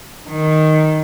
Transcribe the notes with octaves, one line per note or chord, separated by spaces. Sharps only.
D#3